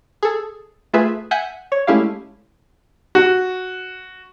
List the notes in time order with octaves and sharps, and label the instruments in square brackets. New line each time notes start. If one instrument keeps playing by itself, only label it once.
[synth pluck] G#4 A4
A3 F4 G#4 B4 E5
E5 F#5 G#5 G6 B6 C#7
C#5
G#3 A3 C#4 E4 G4 F5
[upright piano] F#4